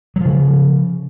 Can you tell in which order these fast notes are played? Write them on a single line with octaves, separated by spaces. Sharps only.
F#3 F3 C#3